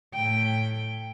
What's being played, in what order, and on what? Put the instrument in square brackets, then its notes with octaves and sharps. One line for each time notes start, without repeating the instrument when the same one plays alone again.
[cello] A2 G5